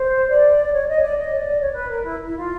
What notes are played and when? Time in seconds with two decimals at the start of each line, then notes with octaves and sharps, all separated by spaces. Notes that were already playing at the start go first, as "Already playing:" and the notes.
Already playing: C5
0.30 D5
0.73 C#5
0.88 D#5
0.95 C#5
1.02 D5
1.17 D#5
1.31 C#5
1.38 D5
1.60 C#5
1.74 B4
1.88 A#4
2.04 E4
2.26 E4
2.36 F4